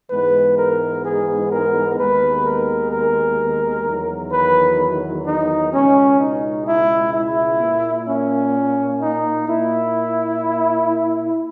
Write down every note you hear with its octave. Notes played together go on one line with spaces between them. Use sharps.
G#2 E3 G#3 B3 B4
A#4
G#4
A#4
D#2 D#3 G#3 B3 B4
A#4
A#4
E2 D#3 F#3
B4
D#4
C#2 B2 G#3 C#4
D#4
E4
E4
A#2 A#3
C#4
D#4
A#2 A#3 E4